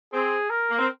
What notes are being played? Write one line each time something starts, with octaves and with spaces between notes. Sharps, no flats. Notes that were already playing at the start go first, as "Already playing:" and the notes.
C4 G#4
A#4
A#3
C4